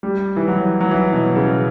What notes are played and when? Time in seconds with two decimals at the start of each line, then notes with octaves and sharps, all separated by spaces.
0.03 G3
0.36 E3
0.48 F#3
0.81 F#3
0.91 E3
1.13 B2
1.36 C#3